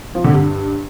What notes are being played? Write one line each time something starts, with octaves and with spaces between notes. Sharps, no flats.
F3
D3
G2